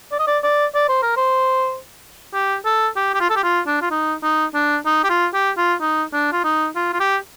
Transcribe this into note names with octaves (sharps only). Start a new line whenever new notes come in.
D5
D#5
D5
D5
D5
C5
A#4
C5
G4
A4
G4
G4
F4
A4
G4
F4
D4
F4
D#4
D#4
D4
D#4
G4
F4
G4
F4
D#4
D4
F4
D#4
F4
F4
G4